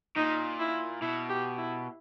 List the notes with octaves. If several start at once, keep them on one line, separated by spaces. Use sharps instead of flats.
A#2 D#4
E4
B2 E4
G4
E4